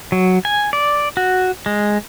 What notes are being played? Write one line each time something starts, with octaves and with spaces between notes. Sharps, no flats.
F#3
G#5
D5
F#4
G#3